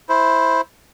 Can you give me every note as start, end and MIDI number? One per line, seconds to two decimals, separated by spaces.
0.09 0.61 64
0.09 0.61 72